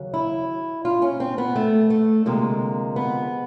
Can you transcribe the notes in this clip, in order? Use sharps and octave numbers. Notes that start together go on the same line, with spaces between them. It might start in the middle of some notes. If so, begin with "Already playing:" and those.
Already playing: D#2 C#3 F#3
E4
F4
C#4
C4
B3
A3
A3
D2 C3 F3 G#3 A#3
B3